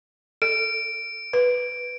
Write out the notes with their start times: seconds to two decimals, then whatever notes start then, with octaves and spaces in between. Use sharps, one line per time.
0.42 A4 D7
1.33 B4